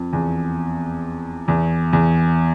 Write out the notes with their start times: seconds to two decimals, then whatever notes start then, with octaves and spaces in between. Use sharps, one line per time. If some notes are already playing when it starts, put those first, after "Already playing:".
Already playing: F2
0.13 E2
1.48 E2
1.93 E2